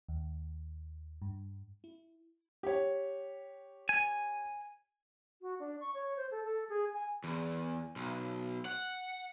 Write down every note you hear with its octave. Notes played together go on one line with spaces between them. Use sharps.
D#2
G2
E4
G4 C#5
G#5
F#4
D4
C#6
C#5
C5
A4
A4
G#4
G#5
E2
B1
F#5